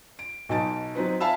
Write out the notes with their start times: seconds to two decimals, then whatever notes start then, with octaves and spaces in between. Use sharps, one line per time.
0.19 D7
0.49 B1 B2 D#4 A5 A6 D7
0.95 F#3 C4 D#4 B4
1.20 E5 F5 G#5 A5 B5 E6